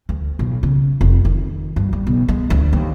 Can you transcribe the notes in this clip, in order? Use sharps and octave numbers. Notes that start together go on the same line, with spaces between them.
D2
B1
C#3
F1
D#3
G2
G3
B1
G#3
D2
D#2